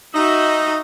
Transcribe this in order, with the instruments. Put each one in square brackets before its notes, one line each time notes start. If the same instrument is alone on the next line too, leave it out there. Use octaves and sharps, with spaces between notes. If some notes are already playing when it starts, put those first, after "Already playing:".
[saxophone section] D#4 [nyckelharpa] F#4 E5